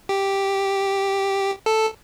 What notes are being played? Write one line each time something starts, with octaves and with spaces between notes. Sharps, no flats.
G4
A4